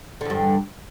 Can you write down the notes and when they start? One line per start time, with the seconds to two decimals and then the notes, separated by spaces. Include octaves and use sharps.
0.21 D3
0.25 E2
0.30 G2